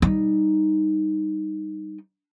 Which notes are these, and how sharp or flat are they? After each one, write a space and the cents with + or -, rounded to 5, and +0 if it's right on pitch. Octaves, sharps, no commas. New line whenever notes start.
G3 +0 D#4 +0